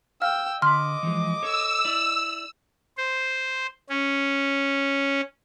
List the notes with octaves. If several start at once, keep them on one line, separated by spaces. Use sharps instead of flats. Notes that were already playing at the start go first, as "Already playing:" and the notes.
F5 G5 E6 F6
D3 D#5 B5 C6 D6 F6
E3 F3 G#3
A4 C#5 E6
E4 D5
C5
C#4